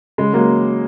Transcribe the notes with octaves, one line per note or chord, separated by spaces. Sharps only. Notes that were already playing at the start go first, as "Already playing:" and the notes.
C#3 G#3
F#3 G#3 A#3